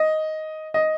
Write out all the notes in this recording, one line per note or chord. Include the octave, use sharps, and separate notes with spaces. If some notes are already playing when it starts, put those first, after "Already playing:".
Already playing: D#5
D#5